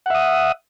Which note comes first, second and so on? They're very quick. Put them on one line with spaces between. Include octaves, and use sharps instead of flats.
F#5 E5 D#6